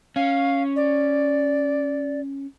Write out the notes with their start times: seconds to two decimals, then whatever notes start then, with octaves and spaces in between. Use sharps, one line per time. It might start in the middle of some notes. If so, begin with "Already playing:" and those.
0.16 C#4 F5
0.76 D5